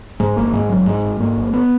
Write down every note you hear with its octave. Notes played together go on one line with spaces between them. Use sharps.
G#2 G#3
G#1 A#3
G#2 G#3
G#1 F#3
G#2 G#3
G#1
G#2 A#3
G#1
B3